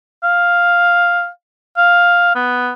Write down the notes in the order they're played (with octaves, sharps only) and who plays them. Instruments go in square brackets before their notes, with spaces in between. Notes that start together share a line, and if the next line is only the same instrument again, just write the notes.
[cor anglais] F5
F5
B3